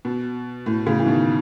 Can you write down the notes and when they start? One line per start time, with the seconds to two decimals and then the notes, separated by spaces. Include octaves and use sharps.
0.05 B2
0.66 A2
0.86 A2 C#3
0.99 E3
1.07 B2 D#3